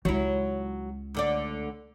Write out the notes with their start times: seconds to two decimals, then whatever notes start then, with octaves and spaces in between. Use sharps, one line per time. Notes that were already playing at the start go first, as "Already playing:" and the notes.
0.05 C#2 F#3 E4
1.14 D2 D3 D5